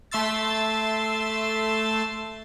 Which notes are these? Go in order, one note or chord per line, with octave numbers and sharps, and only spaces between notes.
A3 E5 C6 E6 A6